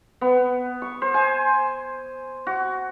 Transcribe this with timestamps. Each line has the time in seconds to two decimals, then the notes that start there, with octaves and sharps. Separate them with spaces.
0.21 B3
0.82 C#6
1.02 C5
1.14 G#5
2.47 F#4